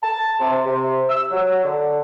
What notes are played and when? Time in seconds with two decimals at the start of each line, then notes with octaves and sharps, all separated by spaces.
0.02 A5
0.40 C3
0.66 C3
1.08 E6
1.31 F#3
1.64 D3